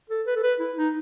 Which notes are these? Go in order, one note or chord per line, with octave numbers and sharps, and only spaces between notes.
A4
B4
A4
B4
E4
D#4